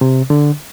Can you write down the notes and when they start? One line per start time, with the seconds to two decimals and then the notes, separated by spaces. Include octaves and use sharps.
0.01 C3
0.30 D3